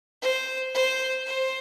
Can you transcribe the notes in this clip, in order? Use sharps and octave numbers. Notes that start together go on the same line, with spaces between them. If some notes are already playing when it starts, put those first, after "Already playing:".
C5
C5
C5